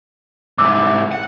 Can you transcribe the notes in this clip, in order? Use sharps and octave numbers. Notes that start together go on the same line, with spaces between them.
C2 G#2 D6 E6
F#5